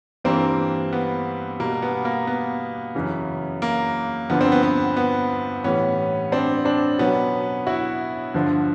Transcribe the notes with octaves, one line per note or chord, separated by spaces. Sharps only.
G2 E3 G3 A#3 C4
B3
B2 G3 A#3
B3
A#3
B3
F#2 C#3 E3
A#3
G2 D3 F3 B3
C4
B3
B3
B3
A2 E3 G3 B3 C#4
C4 D4
C4 D4
B2 F#3 B3 C#4
E4 F#4
G2 D3 F3